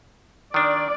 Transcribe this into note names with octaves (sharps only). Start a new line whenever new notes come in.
D#3 D4 D5